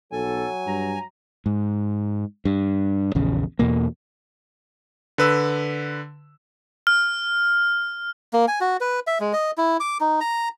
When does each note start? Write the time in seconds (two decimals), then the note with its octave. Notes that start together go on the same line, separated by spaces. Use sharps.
0.12 B1 F#3 A4 G#5
0.66 G2 A#5
1.46 G#2
2.45 G2
3.15 A#1 E2 C#3
3.59 E2 B2 A#3
5.18 D3 B4 E6
6.87 F6
8.33 A#3
8.48 G#5
8.61 F#4
8.81 B4
9.07 E5
9.20 G#3
9.33 D#5
9.57 E4
9.80 D6
10.01 D#4
10.21 A#5